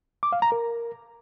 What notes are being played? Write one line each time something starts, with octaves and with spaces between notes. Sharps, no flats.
D6
F5
A#5
A#4